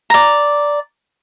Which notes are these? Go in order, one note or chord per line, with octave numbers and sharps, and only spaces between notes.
D5 A#5